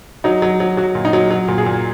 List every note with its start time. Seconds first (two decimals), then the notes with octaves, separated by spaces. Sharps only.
0.24 F#3 D#4
0.42 F#3
0.60 F#3
0.77 F#3 F#4
0.95 A#2
1.05 D#4
1.13 F#3
1.31 F#3
1.48 A#2
1.58 G#4
1.66 A#2